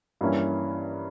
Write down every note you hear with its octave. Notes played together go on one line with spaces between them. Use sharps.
G2 E3 A#3 C#4 E4